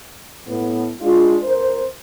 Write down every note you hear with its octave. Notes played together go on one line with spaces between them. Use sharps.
A2 B3
G#3 D4 F4
F2 A#4 C5